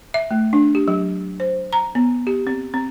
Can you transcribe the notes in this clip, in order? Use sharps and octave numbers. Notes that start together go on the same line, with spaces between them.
E5
A3
D4
G4
F#3
C5
A#5
B3
G4
C4
C4